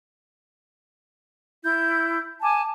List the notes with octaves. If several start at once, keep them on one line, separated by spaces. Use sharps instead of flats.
E4 G6
G#5 A5 D6